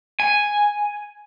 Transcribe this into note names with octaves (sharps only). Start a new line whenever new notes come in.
G#5